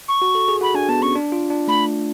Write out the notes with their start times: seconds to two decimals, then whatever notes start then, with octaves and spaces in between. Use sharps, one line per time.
0.08 C#6
0.22 F#4
0.35 A4
0.48 G#4
0.61 F#4 B5
0.75 D4 G#5
0.89 B3 A5
1.02 C#4 C#6
1.15 D4
1.32 F4
1.50 D4
1.68 A3 B5